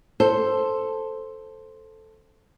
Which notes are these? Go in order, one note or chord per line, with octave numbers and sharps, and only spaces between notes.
A4 C5